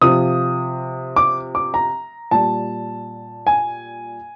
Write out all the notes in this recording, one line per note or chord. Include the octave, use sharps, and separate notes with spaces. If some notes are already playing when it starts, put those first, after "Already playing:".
C3 F3 D#6
D6
D6
A#5
A#2 G3 A5
G#5